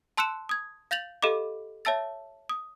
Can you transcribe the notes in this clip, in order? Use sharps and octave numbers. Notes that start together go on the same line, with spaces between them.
A5 C6 E6 F#6 C#7 E7
D#6 G#6
F5 G6 A6 F7 F#7
G4 A4 D#5 F5 B5 D6
C#5 E5 A5 E6 A6
D#6